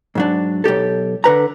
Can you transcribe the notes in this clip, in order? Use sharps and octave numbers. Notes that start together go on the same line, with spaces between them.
G#2 F#3 D4
B1 G#2 G4 A4
D3 B4 A#5